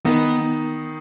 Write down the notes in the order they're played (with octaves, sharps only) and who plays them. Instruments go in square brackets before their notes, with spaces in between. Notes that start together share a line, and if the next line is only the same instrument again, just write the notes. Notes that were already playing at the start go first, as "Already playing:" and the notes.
[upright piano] D#3 D#4 [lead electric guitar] B3